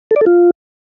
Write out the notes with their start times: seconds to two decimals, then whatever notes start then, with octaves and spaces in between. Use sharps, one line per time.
0.11 A4
0.16 D5
0.21 A4
0.26 F4